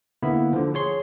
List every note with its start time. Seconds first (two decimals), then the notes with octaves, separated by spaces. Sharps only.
0.23 D3 A#3 B3 E4
0.53 D3 F3
0.74 G#4 C#5 C6